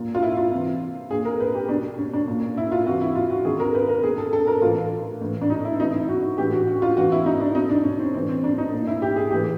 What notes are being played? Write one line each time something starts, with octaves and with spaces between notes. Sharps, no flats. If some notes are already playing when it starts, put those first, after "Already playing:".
Already playing: A#2
F4
E4
F4
C3 E3
A#2 G#4
A#4
B4
G4
B2 D4
C#4
D4
A#2
E4
F4
C3 E3 F#4
E4
F4
F#4
C3 D#3 G#4
A#4
B4
A#4
B2 G#4
A4
A4
A#4
A2 E3 F4
A2 E3
D4
D#4
E4
C3 E3 D#4
E4
F#4
A2 E3 G4
F#4
F#4
F4
C3 E3 F#4
E4
D#4
D4
B2 D#4
D4
C#4
C4
A2 E3 C4
C4
D4
D#4
A#2
E4
G4
G#4
A2 E3 G4